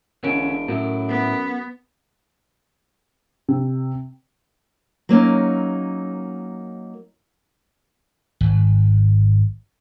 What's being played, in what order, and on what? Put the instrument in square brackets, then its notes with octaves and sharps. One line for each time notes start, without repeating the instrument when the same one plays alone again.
[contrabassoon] E1 [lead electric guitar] D3 C#4 [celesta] A#4 D7
[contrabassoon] F#2 [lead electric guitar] A2 E4
[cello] B3
[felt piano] C3
[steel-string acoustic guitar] F#3 A#3 C#4 D#4
[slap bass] G#1